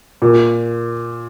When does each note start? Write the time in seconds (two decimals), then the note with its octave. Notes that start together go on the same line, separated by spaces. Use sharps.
0.22 A#2